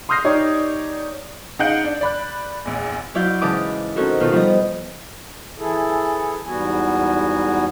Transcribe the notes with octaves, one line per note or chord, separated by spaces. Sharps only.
C6 D#6 F6 G6 A#6 C7
D#4 G4 C#5 D5
C#3 D#4 F5 F#5 G6 D7
D4
D5 B5 F#6
A#1 E2
F#3 E4 D5 F5 G6
G#2 C#3 E3 A5 D6 D#6
C4 C#4 D#4 F#4 A4 A#4
B2 D#3 F4 A4
F3 G3 B3 C5 D#5
E3 E4 G#4 A4
E2 G#2 G3 B3 F#4 G#5